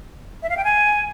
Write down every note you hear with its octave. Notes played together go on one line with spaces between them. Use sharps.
E5
F5
G5
G#5